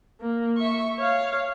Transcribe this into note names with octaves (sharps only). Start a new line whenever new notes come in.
A#3
E5 C#6
C#5 F5